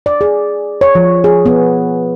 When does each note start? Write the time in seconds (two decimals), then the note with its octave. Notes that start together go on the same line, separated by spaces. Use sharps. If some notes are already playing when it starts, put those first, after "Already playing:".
0.06 D5
0.21 G#4
0.81 C#5
0.95 F3
1.24 G#4
1.46 B3